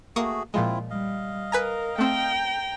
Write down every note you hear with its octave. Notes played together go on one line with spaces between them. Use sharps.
A3 A#3 F#4 G#4 C#6 D#6
A#2 F3 G#3 C4 E4 F4
G3 D#5 F5
A#4 B4 G#5 A#5
A3 C4 G5 A#5